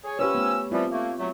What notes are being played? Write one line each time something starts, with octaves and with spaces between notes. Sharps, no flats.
G#4 C#5
F3 C#4 G4 B4 C#5 E6
A3 B3
E3 F3 G3 C4 F4
A3 A#3
F#3 A3